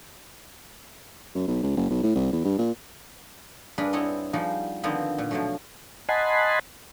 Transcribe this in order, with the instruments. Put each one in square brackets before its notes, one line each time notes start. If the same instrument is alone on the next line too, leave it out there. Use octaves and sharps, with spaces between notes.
[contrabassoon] F#2
B1
C#2
F#1
B1
A2
C2
E2
G2
A#2
[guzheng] G2 D4 G#4 A#4 B4 B5
B3 C4 E4 C#5 D#5
F3 G3 D#4 F#4 G#4
D3 D#3 F3 B3 C4 D#5
A#2
B2 D3 F3 F#3 A3
[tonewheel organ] D#5 F#5 G#5 A5 B5 C6